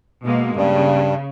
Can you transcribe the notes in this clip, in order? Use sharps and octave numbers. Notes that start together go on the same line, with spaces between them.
B2 G#3 A#3
G2 C#3